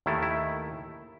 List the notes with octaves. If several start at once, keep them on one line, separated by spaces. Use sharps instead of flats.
D#2 D#3 A3 E4
E4